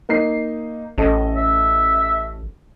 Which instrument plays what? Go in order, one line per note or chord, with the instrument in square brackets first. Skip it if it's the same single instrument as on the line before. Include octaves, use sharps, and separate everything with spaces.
[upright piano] A#3 D#4 C7
[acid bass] A1 [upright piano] C#4 A4 D#5
[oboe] E5